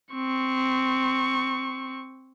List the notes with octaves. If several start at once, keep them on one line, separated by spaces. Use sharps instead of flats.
C4 C#6